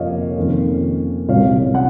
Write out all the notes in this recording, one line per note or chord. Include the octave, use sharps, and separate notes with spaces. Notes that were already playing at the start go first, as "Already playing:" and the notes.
Already playing: F2 C3 F3 A#3 C#4 C#5 D#5 F5
F2 D#3 A#3 C#4 F4
C2 A#2 F#3 C#5 F5
F#5